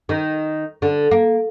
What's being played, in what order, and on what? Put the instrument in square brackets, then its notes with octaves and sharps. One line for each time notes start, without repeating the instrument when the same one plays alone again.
[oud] D#3
D3
A#3